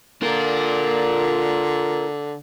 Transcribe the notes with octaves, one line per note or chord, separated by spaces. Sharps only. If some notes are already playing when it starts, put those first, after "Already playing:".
D3 F4 A#4